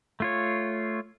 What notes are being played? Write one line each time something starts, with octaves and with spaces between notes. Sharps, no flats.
A3 F4 C#5